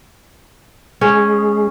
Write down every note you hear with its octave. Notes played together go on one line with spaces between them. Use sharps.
G#3 C#4 G#4